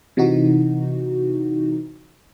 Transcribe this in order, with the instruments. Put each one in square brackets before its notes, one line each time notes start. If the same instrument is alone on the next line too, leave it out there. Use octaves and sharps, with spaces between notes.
[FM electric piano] C3 E3 D#4 F#4